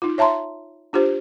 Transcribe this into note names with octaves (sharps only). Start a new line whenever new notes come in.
D#4 F4
C#5 E5 A5 A#5 C6
D4 F4 G4 C5